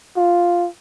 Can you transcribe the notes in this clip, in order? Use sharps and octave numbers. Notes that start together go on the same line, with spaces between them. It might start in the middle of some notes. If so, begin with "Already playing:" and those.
F4